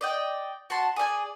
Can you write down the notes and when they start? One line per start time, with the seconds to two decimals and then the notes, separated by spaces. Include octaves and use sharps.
0.01 D5 D#5 G5
0.70 F#4 F#5 A5 C6
0.96 G#4 D5 F5 G#5